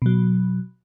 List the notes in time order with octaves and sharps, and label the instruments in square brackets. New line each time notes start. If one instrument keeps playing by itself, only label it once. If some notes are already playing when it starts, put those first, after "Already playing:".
[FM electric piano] B2 F#3